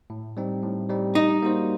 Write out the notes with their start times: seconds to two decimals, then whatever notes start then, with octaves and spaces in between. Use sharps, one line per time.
0.10 A2
0.37 G3 C4 D#4
0.63 A2
0.90 G3 C4 D#4
1.15 G3 D#4
1.42 A#3 F#4 C5